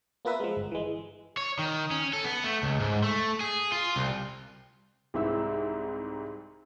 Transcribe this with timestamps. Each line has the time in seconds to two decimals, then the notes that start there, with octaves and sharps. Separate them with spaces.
0.25 A#3 B3 F4 A#4 B4 E5
0.40 F3 G#3
0.57 G1
0.72 E3 G#3
1.37 C#5
1.59 D#3
1.91 C#4
2.13 A4
2.25 B3
2.44 A3
2.63 C#2
2.80 G#2
3.03 A3
3.40 G#4
3.72 F4
3.96 C2
5.14 C2 G#2 E4 E6